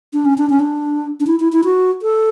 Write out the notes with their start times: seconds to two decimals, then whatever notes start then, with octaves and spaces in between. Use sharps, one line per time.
0.13 D4
0.25 C#4
0.38 D4
0.50 C#4
0.60 D4
1.20 D4
1.27 E4
1.40 E4
1.52 E4
1.64 F#4
2.02 A4